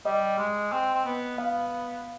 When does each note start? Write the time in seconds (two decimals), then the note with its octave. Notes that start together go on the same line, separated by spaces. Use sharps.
0.05 G3 D#5
0.39 G#3
0.72 C4
0.94 C4
1.05 B3
1.38 B3 F5